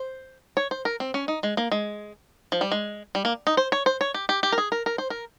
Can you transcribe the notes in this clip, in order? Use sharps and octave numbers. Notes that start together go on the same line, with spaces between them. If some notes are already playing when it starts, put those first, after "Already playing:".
Already playing: C5
C#5
C5
A#4
C4
C#4
D#4
G#3
A#3
G#3
F3
G3
G#3
G3
A#3
D#4
C5
C#5
C5
C#5
G4
G4
G4
A#4
G#4
A#4
A#4
C5
A#4